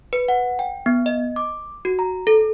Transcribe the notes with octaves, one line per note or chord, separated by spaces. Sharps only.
B4
F#5
G5
B3
D#5
D6
F#4
A#5
A4